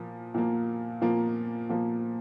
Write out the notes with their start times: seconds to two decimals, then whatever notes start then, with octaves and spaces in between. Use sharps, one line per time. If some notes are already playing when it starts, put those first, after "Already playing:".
Already playing: A#2 F3 A#3
0.34 A#2 F3 A#3
1.01 A#2 F3 A#3
1.69 A#2 F3 A#3